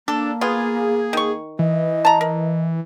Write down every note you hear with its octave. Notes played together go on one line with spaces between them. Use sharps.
A#3 D4 A4
B3 F4 G#4
D#3 C#6
E3 D#5
A5 A#5
A#4